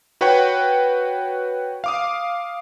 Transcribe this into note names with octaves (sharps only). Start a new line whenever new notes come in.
F#4 B4 C#5 F#5 G5 C#6
F5 D6 D#6